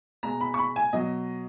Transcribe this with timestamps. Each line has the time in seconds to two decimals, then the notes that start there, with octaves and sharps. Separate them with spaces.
0.23 B2 G#3 A#5
0.41 B5
0.54 C#6
0.59 B5
0.76 G#5
0.93 B2 F#3 D#5